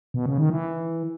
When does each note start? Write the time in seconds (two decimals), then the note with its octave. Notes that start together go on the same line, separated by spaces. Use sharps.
0.14 B2
0.26 C#3
0.38 D#3
0.50 E3